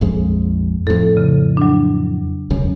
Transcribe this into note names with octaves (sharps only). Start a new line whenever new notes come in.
A#1 F2 G#3
F2 A2 A4
C#3
F#3 D4
E1 C#2 F#2